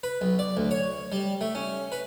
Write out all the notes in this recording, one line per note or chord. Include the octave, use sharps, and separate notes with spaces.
B4
B1
D5
D2
C#5
G3
A3
C#4
B4